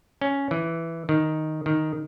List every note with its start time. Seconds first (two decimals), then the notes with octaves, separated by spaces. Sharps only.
0.21 C#4
0.51 E3
1.09 D#3
1.66 D#3